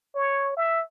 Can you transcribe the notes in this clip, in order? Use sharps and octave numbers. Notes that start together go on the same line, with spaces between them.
C#5
E5